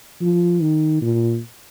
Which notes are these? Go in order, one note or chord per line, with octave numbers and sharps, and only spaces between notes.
F3
D#3
A#2